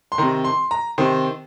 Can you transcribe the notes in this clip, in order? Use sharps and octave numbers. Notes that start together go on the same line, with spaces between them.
C6
C3 D#3 A#5
C6
A#5
C3 D#3 C5